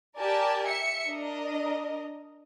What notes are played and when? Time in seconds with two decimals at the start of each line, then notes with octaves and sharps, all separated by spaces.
0.18 G4 A#4 D5 G#5 A5
0.65 E5 C#7
1.07 D4 A#4 D#5